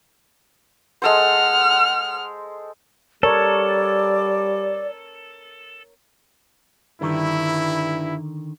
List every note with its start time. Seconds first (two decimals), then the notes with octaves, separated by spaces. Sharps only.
1.02 G#3 A4 C5 F#5 F6
3.23 G3 A4 A#4 C#5 D5
7.01 G2 D3 D#3 E4